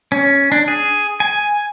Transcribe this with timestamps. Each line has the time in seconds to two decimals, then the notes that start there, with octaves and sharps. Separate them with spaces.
0.12 C#4
0.52 D4
0.68 G#4
1.20 G#5